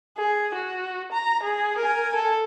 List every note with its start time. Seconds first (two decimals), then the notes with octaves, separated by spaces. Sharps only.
0.18 G#4
0.54 F#4
1.12 A#5
1.43 G#4
1.78 A#4 G#5
2.15 A4